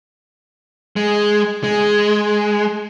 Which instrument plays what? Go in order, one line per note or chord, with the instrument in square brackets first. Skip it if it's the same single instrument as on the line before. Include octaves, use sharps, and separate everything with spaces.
[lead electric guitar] G#3
G#3